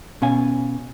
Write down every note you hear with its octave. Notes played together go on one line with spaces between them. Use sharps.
B2 C#4 F5 G#5